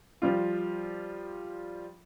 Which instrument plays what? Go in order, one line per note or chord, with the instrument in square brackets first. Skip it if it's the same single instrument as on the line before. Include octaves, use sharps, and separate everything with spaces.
[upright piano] F3 G3 F4